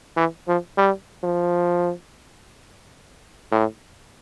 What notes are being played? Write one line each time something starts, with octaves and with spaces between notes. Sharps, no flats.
E3
F3
G3
F3
A2